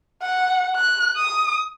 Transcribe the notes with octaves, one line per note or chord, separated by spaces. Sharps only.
F#5
F#6
D#6